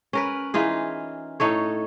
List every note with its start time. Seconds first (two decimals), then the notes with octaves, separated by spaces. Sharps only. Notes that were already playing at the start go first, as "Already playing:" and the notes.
0.13 C#4 A#4 B4
0.54 E3 D#4 F4 G#4
1.40 A2 D#4 A4 C#5